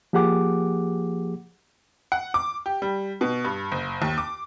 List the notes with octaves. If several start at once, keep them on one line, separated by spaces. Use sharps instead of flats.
F3 A#3 G4 G#4 F#5 D6
F#5
D6
G4
G3
B2
G2
F#1
D#2
D6